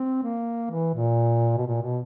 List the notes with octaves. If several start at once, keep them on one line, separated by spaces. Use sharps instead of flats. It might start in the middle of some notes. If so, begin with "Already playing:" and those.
Already playing: C4
A#3
E3
A#2
B2
A#2
B2